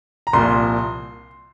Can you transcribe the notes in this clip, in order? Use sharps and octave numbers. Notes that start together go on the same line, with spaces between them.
A#5
C2 A#2 F3 C6